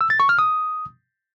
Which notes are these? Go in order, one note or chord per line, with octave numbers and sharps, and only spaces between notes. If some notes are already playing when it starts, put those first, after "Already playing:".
E6
A6
C#6
F6
D#6